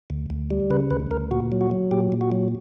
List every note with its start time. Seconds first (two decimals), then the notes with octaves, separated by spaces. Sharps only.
0.10 D2
0.30 D2
0.51 G3
0.70 C#3 B4
0.91 D2 B4
1.11 D2 A#4
1.31 A#2 F#4
1.52 F#3
1.61 F#4
1.71 F#3
1.91 A#2 G4
2.12 A#2
2.21 F#4
2.32 F#3